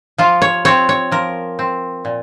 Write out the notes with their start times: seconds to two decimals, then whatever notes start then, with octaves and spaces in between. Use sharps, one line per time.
0.18 F3 F4
0.42 C#5
0.65 C4 C#5
0.89 C#5
1.12 F3 A#4
1.59 C4
2.05 A#2